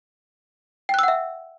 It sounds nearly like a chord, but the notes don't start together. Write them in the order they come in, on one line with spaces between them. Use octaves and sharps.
G5 F#6 E6 F#5 E5